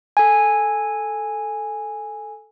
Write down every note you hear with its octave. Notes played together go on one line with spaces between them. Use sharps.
A4 G#5